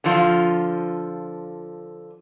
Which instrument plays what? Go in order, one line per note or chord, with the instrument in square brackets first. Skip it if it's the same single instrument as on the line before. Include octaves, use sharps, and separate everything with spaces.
[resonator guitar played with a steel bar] D3 F3 F4